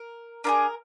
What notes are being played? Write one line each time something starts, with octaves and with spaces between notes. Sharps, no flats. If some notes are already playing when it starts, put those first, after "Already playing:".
Already playing: A#4
D4 F4 G#4 A#4